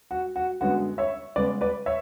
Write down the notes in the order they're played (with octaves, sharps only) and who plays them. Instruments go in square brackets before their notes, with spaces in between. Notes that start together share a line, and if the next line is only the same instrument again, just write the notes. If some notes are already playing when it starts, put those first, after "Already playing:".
[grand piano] F#4
F#4
F#2 D3 G#3 B3 F#4
C#5 E5
C#3 G#3 B3 B4 D5
B4 D5
C#5 E5